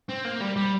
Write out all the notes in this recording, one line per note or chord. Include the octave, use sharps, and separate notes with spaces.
C4
A#3
G3
G3